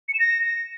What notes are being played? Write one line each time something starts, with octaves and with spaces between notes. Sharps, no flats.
C#7
E7
A#6